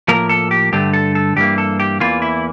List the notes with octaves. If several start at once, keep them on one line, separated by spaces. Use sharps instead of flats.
A2 F3 A#3 A#4
A4
G4
G2 D3 A3 G4
A4
A4
G2 E3 A#3 G4
A4
G4
E2 E3 A#3 F4
E4